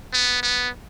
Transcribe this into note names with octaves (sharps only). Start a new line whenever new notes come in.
B3
B3